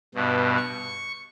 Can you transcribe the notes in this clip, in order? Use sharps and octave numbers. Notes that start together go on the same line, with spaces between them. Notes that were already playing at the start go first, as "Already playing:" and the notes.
G2 B2
C#6